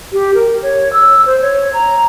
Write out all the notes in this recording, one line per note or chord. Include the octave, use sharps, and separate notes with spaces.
G4
A#4
C#5
E6
C5
C#5
A#5